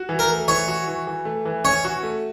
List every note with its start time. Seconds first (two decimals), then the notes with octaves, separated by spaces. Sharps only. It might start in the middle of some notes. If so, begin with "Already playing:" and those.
Already playing: F#4
0.09 E3
0.19 A#4
0.29 A3
0.48 E3 C#5
0.68 F#4
0.87 E3
1.07 E3
1.25 A3
1.45 E3
1.64 C#4 C#5
1.85 F#4
2.03 A3